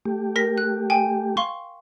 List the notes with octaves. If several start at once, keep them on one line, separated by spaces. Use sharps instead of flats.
A3 G4
A#4 A#6 B6
F#6
G5 G#5
F5 C6 C#6